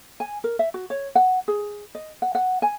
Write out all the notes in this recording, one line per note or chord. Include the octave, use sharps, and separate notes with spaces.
G#5
A#4
E5
F#4
C#5
F#5
G#4
D#5
F#5
F#5
G#5